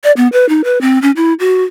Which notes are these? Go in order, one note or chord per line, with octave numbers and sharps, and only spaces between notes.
D5
B3
B4
D#4
B4
C4
C#4
E4
F#4